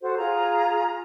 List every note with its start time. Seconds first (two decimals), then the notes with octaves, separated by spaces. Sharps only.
0.01 F#4 A4 C5
0.16 F4 G#4 A#5